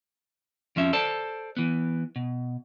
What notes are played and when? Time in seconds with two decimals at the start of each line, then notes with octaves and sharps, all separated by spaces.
0.76 F2 F3 C#4 E5
0.93 A4 C5 D5 A5
1.57 E3 B3
2.16 B2